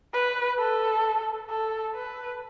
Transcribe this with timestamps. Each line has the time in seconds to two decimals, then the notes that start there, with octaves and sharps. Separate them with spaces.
0.13 B4
0.59 A4
1.50 A4
1.95 B4